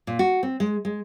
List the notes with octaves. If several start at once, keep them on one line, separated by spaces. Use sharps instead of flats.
A#2
F#4
C4
G#3
G#3